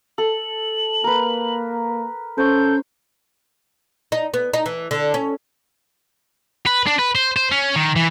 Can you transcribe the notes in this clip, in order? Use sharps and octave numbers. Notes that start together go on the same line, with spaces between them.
A4 F#7
A#3 A#4 B4
C#4 A4 C5 C#6 G6
D#4
B3
D#4
E3
D3
C#4
B4
D4
B4
C5
C5
C#4
D#3
E3